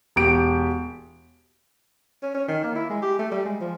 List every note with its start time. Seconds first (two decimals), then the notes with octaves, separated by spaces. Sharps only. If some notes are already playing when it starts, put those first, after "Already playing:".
0.16 E1 G4 D7
2.23 C#4
2.35 C#4
2.48 D#3
2.64 A#3
2.75 E4
2.90 G#3
3.02 G4
3.19 A3
3.31 G3
3.46 G#3
3.61 F3